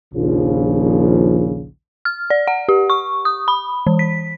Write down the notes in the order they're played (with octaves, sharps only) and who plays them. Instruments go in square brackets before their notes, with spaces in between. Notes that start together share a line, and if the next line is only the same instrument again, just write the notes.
[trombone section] A#1 D#2 C#3 F3
[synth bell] F6
D5
F#5
G4
C#6
D#6
B5
E3
B6